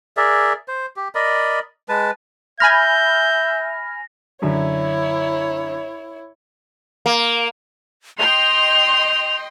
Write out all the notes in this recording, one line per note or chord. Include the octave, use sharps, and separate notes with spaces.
G#4 A#4 D5 E5
C5
G4
A#4 D5 D#5 B5
G#3 B4 A5
E5 G#5 B5 F6 G6 A#6
F#2 D3 E4 C#5 E5
A#3
D#5 G5 C6 F7